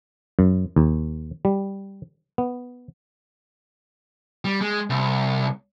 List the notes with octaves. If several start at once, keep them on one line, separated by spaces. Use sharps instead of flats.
F#2
D#2
G3
B3
G3
G#3
C2